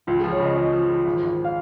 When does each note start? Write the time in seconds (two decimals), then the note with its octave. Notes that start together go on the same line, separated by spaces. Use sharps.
0.07 C#2 F4
0.19 F3 G#4
0.32 C#5
0.40 C#3 D#5
0.56 F3 D#5
0.73 F3
0.90 F3
1.05 G#1
1.23 G#1
1.44 F5